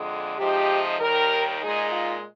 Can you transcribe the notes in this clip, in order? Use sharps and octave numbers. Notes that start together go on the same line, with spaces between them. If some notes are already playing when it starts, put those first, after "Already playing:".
Already playing: F2 D3 G#3
C3 F3 G#3 D#4 G4
D#2 D#3 G3 A#4
A#2 G#3 D#4 G#4
F4